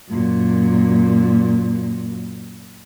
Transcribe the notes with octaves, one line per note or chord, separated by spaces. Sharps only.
F#2 A#2